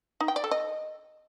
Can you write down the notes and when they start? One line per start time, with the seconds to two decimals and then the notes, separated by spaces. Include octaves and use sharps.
0.21 D#4
0.28 G5
0.36 D5
0.44 A4
0.51 D#5